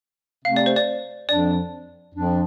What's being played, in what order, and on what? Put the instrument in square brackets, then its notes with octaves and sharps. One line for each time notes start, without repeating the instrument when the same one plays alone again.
[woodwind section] C3 A3 C4 [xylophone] F5
[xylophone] D5
C5
D5
[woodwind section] F2 F3 D4 [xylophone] D5
[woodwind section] F2 F3 D4